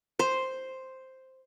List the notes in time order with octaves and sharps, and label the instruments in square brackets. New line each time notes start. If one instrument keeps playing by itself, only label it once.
[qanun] C5